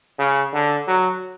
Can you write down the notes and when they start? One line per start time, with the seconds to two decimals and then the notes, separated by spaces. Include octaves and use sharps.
0.19 C#3
0.53 D3
0.88 F#3